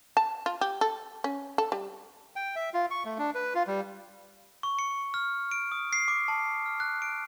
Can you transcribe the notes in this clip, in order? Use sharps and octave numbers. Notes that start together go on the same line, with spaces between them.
A5
F4
G4
A4
C#4
A4
G3
G5
E5
F4
C#6
A3
D4
B4
F4
G3
C#6
C#7
F6
D7
D#6
C7
D6
A5
F6
F#6
D7